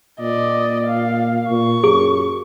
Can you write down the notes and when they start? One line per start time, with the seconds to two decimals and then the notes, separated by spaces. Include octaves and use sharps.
0.20 A#2 D5 D#5
0.87 F5
1.49 A#2 C#6
1.84 F#2 G#4